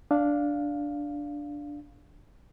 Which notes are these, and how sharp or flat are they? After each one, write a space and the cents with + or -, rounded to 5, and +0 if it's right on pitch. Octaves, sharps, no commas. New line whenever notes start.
D4 -5 F5 +0